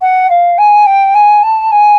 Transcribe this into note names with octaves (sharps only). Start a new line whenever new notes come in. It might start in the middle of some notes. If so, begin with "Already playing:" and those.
F#5
F5
G#5
G5
G#5
A5
G#5